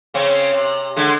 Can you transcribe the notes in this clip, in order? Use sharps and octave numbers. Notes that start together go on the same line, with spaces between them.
C#3 C4 C#4
C3
D3 G#3